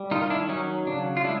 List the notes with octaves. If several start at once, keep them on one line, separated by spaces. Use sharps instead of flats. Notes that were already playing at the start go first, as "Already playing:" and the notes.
Already playing: G3
D#3 D#4 F4
F4
D4 E4
F#3 C#4 D#4
C#3 D4
F4
G#3 D4 E4